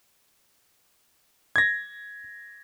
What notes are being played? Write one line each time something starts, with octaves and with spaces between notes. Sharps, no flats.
G#6 A#6